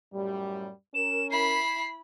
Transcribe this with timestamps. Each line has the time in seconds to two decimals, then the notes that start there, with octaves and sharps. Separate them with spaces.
0.14 F#2 A2 G3
0.95 C#4 A#4 E7
1.31 E4 B5 C7